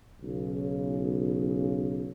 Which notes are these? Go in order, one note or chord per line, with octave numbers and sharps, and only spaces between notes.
B1 C#3